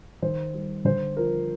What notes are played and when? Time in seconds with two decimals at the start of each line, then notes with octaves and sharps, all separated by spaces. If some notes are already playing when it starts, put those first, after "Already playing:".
0.22 D#3 C5
0.54 G3
0.85 D3 C5
1.17 F3 A#4